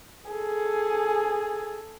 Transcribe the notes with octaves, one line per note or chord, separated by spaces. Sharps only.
G#4 A4